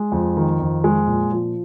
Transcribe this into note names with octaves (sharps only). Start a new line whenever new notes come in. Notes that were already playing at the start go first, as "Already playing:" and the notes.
Already playing: G#3
F2
D#3
F2
G#3
A#2
F3